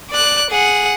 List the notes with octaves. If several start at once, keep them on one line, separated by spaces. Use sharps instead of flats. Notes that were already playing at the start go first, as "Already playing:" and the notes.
D5 F#6
G#4 F#5